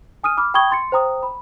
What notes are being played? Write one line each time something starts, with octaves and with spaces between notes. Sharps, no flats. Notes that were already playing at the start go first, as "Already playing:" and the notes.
G#5 D#6 F6 D#7
B5 D6 F6
G5 B5 C#6 D#6 G#6 G7
C6 A6 C#7
C5 G5 A#5 D#6
B5